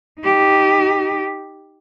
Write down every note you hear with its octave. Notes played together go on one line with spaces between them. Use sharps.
D#4 G4